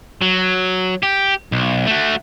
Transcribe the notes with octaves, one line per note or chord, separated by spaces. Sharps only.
F#3
G4
B1
A3 F#4